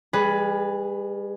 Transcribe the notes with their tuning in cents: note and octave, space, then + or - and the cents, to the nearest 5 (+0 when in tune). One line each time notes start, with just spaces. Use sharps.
G3 +45 G#4 +10 B4 +0